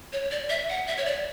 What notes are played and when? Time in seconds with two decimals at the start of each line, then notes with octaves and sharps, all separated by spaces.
0.13 C#5
0.31 D5
0.50 E5
0.69 F#5
0.88 E5
0.97 C#5
1.06 D5